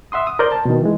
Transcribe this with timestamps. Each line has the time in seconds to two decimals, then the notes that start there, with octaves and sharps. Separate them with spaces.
0.12 E5 F#5 C6 D#6
0.27 D#6
0.39 A#4 C5 D5 G6
0.52 A5
0.65 B2 D#3
0.82 E3 G#3